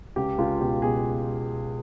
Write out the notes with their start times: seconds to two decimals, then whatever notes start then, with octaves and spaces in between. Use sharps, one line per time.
0.16 C#2 G4
0.38 C#2 F4
0.60 B2 G4
0.82 B2 G#4